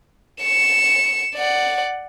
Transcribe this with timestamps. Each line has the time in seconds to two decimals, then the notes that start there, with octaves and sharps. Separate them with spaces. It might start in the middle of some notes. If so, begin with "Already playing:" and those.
0.42 C#7 E7
1.36 D5 F#5